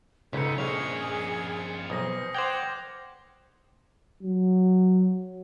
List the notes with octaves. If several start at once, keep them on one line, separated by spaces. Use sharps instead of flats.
C#2 G#2 C#3 A4 B6 C#7
A#1 F3 G#4 C#5 D#5 F6 F7
B1 C5 G#5 D#6 A#6
C5 F#5 G5 D6 G#6 F7
F#3